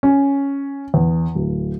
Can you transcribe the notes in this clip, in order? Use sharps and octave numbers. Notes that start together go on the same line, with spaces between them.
C#4
E2
D1